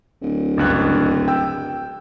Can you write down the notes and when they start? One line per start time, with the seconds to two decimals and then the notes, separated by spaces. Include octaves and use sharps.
0.22 D1
0.58 G1 C#2 F#6
1.28 G5 E6